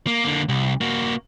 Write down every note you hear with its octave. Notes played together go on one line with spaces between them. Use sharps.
A#3
D3 A#3
C2
A#3 F#4